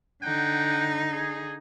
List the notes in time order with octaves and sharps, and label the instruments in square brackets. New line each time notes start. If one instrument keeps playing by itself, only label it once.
[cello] D3 D#4 [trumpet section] F#5 G5
[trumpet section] G#4